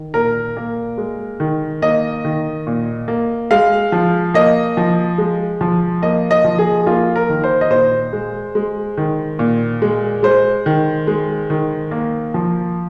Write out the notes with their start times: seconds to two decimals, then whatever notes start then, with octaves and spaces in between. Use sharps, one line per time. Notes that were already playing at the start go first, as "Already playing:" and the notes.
Already playing: D#3
0.14 A#2 A#4
0.57 A#3
0.98 G#3
1.40 D#3
1.82 A#3 D#5
2.25 D#3
2.67 A#2
3.08 A#3
3.51 G#3 F5
3.92 F3
4.34 A#3 D#5
4.77 F3
5.18 G#3
5.61 F3
6.02 A#3 D#5
6.31 D#5
6.44 F3
6.59 G#4
6.87 A#3 F4
7.16 A#4
7.29 D#3
7.44 C5
7.61 D#5
7.71 A#2 C5
8.13 G#3
8.55 G#3
8.97 D#3
9.39 A#2
9.82 G#3
10.23 G#3 C5
10.66 D#3
11.07 G#3
11.50 D#3
11.91 A#3
12.34 F3